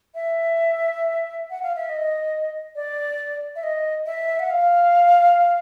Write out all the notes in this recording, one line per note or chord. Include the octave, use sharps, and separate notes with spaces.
E5
F#5
F5
E5
D#5
D5
E5
D#5
E5
F#5
F5